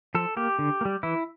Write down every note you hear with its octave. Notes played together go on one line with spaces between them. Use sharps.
F3 A4
A#3 G4
D3
A#3
G3
E3 E4